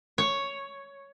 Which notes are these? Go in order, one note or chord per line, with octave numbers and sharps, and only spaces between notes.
C#5